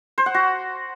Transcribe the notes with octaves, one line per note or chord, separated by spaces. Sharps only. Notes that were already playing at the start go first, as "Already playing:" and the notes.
C5
F#5
F#4